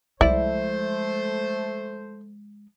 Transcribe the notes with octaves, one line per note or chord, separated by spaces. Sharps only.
C2 F3 G#3 A3 E4 C5 D5